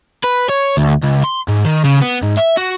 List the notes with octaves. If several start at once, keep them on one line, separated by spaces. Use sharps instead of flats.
B4
C#5
D2
C#2
C6
G#2
D#3
C#3
B3
G#2
E5
F#4